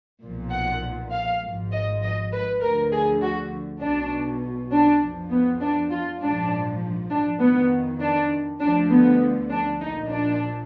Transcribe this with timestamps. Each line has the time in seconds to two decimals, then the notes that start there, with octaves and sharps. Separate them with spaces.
0.22 B1 A#2 F3
0.51 F#5
1.11 F5
1.42 G#1 G#2 F3
1.72 D#5
2.02 D#5
2.32 B4
2.62 D2 D3 F3 A#4
2.92 G#4
3.21 F#4
3.82 B1 B2 D4
4.71 D4
5.01 F2 F3
5.31 B3
5.61 D4
5.91 F4
6.21 A#1 G#2 F3 D4
7.11 D4
7.41 F2 D#3 B3
8.00 D4
8.60 D2 D3 F3 D4
8.91 B3
9.51 D4
9.80 A#1 A#2 F3 D#4
10.10 D4